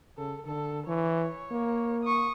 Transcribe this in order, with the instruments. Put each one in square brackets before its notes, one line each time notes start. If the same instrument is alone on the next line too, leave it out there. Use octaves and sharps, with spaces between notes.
[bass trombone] C#3 [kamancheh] A4
[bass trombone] D3 [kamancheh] A4
[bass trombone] E3 [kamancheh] C#5
[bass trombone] A#3
[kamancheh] C#6 D#6